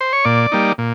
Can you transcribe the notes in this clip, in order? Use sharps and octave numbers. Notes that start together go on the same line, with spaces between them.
C5
C#5
A#2 D5
G3 A#3 D#4
A#2